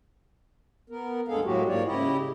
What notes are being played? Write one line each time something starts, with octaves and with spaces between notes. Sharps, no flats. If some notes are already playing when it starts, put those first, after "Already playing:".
B3 A#4
D2 G2 G#3 G#4 A4 F5
A2 F#3 G#3 A#3 F#4 G4
G#2 F3 A#3 C#5 D5
C#3 E4 G4 D#5